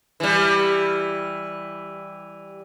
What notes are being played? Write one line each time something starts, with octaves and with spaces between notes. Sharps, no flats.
E3 G3